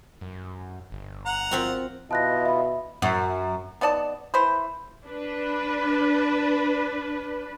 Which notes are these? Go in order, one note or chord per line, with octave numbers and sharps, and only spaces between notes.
F#2
G1
F#5 A#5
F3 C4 F#4
B2 E4 F4 D#5 A5 F#6 A#6
E5 B5
F#2
B3 D#4 D5 A5
E3 B4 C5
D4 B4